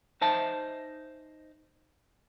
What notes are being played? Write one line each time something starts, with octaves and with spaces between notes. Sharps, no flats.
D#4 C5 E5 A5